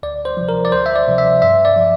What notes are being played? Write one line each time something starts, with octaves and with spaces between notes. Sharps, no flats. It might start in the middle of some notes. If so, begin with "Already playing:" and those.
D2 D5
C5
C3 F3
A#4
D5
D2 C5
E5
D5
C3 F3
E5
G2 E5
D5
F3